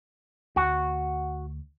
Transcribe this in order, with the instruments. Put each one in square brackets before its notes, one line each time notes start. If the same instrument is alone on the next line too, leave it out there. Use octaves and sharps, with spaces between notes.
[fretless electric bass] D2 [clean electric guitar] F#4